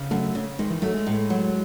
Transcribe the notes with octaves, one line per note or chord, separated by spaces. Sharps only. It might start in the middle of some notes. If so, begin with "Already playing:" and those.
Already playing: C#3
F#2 A3
C#3
D#3 G#3
E3
F#3 A3
G#3
A2
F#3